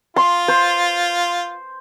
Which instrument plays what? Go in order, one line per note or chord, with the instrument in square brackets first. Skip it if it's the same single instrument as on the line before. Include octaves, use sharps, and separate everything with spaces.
[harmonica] F4 [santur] C6
[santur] C5